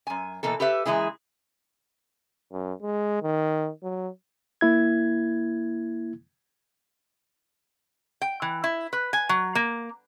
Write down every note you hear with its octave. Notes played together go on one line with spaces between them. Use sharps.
F#2 G#5
B2 E3 A#3 A4
G4 A4 B4 E5
F#2 E3 G#3 E4 G#4
F#2
G#3
D#3
F#3
A#3 E4 G#6
G5
E3
E4
B4
G#5
F#3
A#3